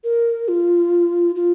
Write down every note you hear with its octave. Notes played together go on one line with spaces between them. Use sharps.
A#4
F4
F4